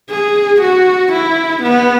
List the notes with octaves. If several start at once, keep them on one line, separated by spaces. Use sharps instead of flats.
G#4
F#4
E4
B3